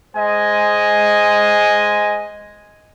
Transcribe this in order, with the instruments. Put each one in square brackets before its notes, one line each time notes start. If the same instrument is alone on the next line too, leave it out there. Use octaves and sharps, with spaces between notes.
[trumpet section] G#3 C5 D#5 G#5